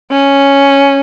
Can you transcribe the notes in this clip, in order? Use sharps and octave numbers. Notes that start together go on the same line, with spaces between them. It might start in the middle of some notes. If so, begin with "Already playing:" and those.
C#4